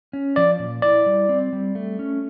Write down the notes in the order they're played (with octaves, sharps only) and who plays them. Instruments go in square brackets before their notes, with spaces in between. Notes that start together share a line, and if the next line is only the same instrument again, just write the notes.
[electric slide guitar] C#4
[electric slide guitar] F3 [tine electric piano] D5
[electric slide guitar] A#2
[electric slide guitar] E4 [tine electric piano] D5
[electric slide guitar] G3
C4
G3
A3
C#4